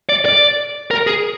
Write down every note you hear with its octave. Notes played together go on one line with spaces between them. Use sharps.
D5
D5
A#4
G#4